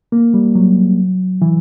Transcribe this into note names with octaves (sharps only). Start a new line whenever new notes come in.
A#3
G3
F#3
E3